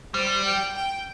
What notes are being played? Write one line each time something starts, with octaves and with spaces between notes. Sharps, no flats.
G3 C5
G5
G5